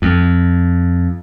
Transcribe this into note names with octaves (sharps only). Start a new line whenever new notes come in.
F2